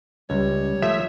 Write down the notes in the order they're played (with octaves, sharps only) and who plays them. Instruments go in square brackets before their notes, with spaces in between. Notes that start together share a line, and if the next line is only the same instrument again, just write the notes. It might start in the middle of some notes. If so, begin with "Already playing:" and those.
[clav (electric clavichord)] C#2 [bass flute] G3 [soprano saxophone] C#5
[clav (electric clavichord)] F3 A3 [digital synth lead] E5